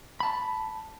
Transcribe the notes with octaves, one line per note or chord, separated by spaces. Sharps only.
A5 B5